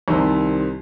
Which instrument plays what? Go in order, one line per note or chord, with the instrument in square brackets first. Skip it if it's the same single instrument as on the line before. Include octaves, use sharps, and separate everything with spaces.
[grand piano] C2 C3 D#3